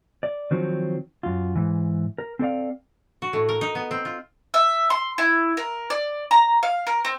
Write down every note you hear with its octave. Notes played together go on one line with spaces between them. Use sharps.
D5
D#3 F3 F#3 C4 D#4
F#2 F4
G#2 E3
A#4
C4 A4 D5 F5
F#4
A2
A#4
D#4
B3
C4
F4
E5
C6
E4
A#4
D5
A#5
F5
A#4
C4